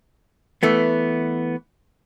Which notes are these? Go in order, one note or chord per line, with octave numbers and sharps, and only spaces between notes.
E3 A3 B3